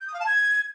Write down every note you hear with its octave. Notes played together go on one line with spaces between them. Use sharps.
G6
D#6
F5
A5
G#6